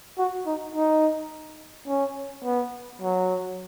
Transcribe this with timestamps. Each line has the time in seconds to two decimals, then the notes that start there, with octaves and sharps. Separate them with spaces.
0.18 F#4
0.46 D#4
0.75 D#4
1.88 C#4
2.45 B3
3.01 F#3